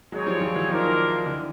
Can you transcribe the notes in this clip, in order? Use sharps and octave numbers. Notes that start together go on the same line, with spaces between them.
F#3 G#3 C4 D#4 G#4 C#5
F3 G3
F3 G3
E3 F#3
D#3 F3 A#3 D4 F4 A#4 D#5
D3 E3